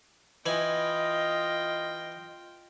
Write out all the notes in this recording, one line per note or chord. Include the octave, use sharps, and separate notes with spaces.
E3 F4 D#5 G5 G#5 B5